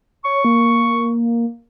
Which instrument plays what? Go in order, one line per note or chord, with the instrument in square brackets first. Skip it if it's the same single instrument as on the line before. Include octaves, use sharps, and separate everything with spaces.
[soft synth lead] C#5 [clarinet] C#6
[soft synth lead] A#3